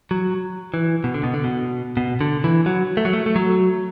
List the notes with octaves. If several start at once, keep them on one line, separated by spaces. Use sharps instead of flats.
F#3
E3
B2
D3
B2
D3
B2
B2
D3
E3
F#3
A3
F#3
A3
A3
F#3